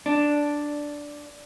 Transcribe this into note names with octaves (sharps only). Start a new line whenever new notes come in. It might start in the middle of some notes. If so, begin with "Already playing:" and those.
D4